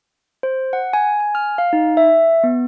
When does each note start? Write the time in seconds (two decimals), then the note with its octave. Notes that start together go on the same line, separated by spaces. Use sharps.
0.43 C5
0.73 F#5
0.93 G#5
1.20 G#5
1.35 F6
1.58 F5
1.73 D#4
1.97 E5
2.43 B3